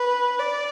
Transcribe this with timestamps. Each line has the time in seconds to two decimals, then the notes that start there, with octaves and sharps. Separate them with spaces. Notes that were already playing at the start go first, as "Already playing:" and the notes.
Already playing: B4
0.39 D5